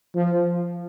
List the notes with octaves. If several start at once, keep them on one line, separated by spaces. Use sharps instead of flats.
F3